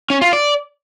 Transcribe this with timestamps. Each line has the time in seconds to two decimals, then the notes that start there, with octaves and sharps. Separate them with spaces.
0.10 C#4
0.21 F4
0.33 D5